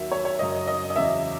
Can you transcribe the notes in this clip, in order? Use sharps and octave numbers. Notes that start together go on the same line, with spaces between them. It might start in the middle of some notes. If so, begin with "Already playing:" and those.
Already playing: D#2 D#3 F#3 E5
C#5
C#5
F#2 C#3 F#3 D#5
D#5
D#5
E2 C#3 F#3 E5